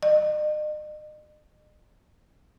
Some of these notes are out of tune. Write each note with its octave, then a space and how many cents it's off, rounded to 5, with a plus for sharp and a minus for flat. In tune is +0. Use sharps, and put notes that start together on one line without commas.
D#5 -40